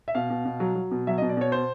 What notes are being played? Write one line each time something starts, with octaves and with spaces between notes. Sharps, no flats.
E5
B2 F5
B2
B2
F#3
F#3
B2
F#3 E5
D#5
B2
D5
B2 C#5
C5